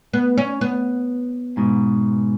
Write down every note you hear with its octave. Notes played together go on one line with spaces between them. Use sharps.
B3
C#4
B3
G#2 B2